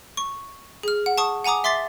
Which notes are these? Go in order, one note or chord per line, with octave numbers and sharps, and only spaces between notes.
C#6
G#4 F6
F#5
A5 C#6 D#6
F#5 G#5 A#5 D6 D#6
E5 C6 D6 A6 B6 C7